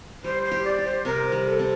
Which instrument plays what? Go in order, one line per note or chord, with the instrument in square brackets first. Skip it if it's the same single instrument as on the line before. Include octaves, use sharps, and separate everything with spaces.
[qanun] G3 [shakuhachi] C5
[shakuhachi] C5
[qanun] G4
[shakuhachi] D5
[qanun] G4
[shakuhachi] C5
[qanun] C3 [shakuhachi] A#4
[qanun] G3
[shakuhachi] A4
[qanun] C4